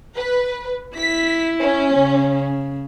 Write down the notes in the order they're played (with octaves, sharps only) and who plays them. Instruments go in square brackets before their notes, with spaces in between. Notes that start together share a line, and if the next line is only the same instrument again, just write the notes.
[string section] B4
[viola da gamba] E4 [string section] B6
[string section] C#4
[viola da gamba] C#3